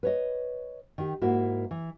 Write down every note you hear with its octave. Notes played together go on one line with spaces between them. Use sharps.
B4 C#5 D#5
D#3 G4
G#2 A#3 E4 F#4
E3